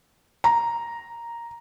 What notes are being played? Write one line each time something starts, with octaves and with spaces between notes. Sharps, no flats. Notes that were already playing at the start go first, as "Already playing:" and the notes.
A#5